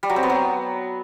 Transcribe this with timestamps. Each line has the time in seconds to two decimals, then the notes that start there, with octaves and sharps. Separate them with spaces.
0.03 G3
0.10 F#3
0.16 C4
0.23 B3
0.30 F#3